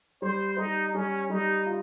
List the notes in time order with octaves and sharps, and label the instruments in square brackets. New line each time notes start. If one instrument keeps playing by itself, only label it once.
[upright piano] G3 [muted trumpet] C5
[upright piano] G3 [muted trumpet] D#4
[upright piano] G3 [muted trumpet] C#4
[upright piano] G3 [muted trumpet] D#4
[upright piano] F4